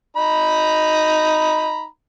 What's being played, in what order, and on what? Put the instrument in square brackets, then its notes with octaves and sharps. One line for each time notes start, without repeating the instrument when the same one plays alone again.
[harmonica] D#4 A#5 B5